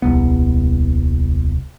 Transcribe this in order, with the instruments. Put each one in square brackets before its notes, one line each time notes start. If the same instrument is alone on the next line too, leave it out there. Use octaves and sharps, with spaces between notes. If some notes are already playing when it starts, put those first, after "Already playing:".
[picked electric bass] D#1 C2 B3